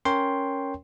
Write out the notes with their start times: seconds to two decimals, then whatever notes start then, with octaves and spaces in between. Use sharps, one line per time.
0.05 C#4 A#4 C#5 G5 C6